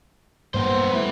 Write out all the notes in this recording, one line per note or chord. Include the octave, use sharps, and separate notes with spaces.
G2 G3 A#3 B3 C5
G3 A3 E4 B4